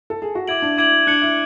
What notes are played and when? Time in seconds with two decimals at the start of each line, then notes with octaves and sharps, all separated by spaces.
0.10 A4
0.22 G#4
0.35 F#4
0.48 E4 D6 G#6 D7 F#7
0.62 D4
0.77 E4 D6 G#6 D7 F#7
1.07 D4 F#6 C#7 F#7
1.22 E4